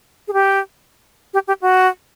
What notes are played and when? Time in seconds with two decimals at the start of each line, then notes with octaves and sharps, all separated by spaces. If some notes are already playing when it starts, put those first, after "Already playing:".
0.28 G#4
0.33 G4
1.34 G4
1.48 G4
1.62 F#4